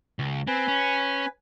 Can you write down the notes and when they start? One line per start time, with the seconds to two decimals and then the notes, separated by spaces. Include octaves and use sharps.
0.19 C#2
0.47 C4 B4 G#5
0.68 C#4